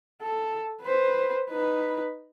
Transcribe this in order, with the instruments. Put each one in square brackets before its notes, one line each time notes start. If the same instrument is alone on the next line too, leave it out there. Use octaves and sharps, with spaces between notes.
[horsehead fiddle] A4
B4 C5
D#4 B4